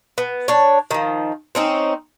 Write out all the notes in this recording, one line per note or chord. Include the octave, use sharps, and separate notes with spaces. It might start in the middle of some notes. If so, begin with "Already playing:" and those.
B3
D4 C#5
D#3 F3
C4 C#4 D#4